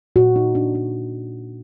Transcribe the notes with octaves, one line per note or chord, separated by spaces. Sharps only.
A#2 F#4
D#4
D4
D4